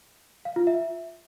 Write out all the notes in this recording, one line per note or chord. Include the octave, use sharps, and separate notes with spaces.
F5
F4
E5